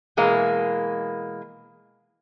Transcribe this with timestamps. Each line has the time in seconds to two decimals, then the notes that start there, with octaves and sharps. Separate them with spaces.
0.17 B2 E3 G#3 A#3